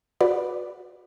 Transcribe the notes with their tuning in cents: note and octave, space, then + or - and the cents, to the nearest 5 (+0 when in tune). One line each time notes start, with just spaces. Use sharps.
F#4 -30 B4 +0 D5 +5